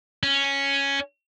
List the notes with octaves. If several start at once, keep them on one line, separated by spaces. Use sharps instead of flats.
C#4